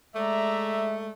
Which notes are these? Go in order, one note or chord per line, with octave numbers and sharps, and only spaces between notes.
G#3 A3 D5 E5 A#5